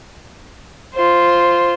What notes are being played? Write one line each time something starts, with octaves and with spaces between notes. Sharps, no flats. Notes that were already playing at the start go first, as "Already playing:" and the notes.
F4 C5